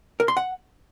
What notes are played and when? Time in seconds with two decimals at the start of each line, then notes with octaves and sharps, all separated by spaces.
0.20 A#4
0.28 C6
0.37 F#5